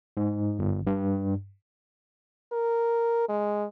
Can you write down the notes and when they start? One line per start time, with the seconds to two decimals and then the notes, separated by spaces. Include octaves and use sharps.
0.17 G#2
0.59 G1
0.87 G2
2.52 A#4
3.29 G#3